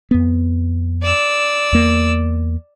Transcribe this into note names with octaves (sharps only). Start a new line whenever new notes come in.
F2 B3
D5 E6
E2 A#3